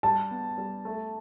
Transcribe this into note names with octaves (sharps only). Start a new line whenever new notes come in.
G3 A5
B3
G3
A3